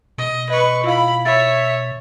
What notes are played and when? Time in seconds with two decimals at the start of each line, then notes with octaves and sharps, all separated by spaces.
0.18 B2 D#5
0.50 B4 D#5 C#6
0.84 E4 F4 F5 B5
1.25 C#5 E5 A6